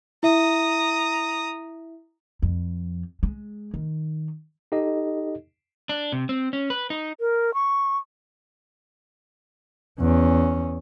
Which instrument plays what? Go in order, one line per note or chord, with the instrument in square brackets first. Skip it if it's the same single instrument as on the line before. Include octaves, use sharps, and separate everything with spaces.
[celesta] E4 E5 [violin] A#5 D#6
[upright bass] F2
G#3
D#3
[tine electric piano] D#4 G4 A4 D#5
[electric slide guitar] D4
C3
C4
C#4
B4
D#4
[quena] A#4
C#6
[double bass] E2 C#4